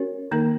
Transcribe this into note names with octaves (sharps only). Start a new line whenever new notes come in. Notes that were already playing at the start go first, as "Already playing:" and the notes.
Already playing: C#4 F#4 A#4 C#5
D#3 A#3 D#4 A#4